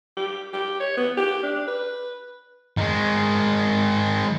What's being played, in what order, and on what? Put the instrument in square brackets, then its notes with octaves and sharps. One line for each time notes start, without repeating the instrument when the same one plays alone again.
[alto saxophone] G4
G4
C#5
B3
G4
D4
B4
[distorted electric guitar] D#3 G#3